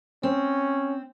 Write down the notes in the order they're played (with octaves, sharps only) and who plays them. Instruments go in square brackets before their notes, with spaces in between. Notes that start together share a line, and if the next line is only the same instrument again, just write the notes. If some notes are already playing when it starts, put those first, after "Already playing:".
[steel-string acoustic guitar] C4 [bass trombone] C#4